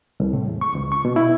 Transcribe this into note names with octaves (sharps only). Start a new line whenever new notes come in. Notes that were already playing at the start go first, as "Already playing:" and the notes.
C2
A2
E2
C#6
C#2
C#6
B2
E4